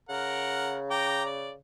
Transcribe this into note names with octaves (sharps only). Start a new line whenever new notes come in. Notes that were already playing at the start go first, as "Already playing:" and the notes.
C#3 A#4 F#5
G5 A#5 D6
D5